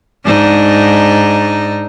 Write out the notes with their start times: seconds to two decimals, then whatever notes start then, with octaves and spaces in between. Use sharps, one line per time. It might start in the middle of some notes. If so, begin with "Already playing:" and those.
0.24 G#2 D4 D#4